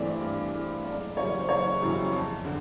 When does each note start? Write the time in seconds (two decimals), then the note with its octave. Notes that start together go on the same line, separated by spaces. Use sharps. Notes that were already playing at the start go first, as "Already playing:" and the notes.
Already playing: G2 E3 A3 C4 D5
0.20 G2
0.53 E3 A3 C4
0.84 F#1 D5
1.17 F#2 C#3 E3 G3 C#5
1.40 C5
1.48 F#1 C#5
1.81 F#2 C#3 E3 G3
2.13 F2
2.45 D3